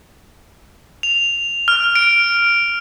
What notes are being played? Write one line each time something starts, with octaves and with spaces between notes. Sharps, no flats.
F7
F6
D7